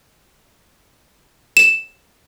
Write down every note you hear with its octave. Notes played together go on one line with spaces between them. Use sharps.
E7